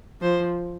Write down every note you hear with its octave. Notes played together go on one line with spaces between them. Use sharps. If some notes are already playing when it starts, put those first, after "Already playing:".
F3 C5